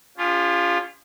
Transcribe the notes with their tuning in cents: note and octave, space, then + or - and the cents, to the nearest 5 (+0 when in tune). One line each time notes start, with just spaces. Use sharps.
C#4 +40 F4 +0 G#4 -45